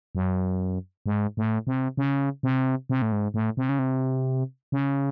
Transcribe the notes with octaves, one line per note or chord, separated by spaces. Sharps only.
F#2
G#2
A2
C3
C#3
C3
C3
A2
G#2
A2
C3
C#3
C3
C#3